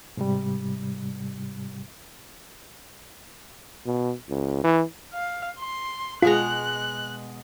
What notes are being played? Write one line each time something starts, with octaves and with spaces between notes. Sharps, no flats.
G#2 C3 G3
B2
C#2
E3
F5
C6
B2 G#3 F4 A#5 F#6